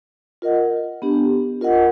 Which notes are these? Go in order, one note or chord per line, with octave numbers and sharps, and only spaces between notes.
F4 A#4 D#5 F#5
B3 D4 G4
F4 A#4 D#5 F#5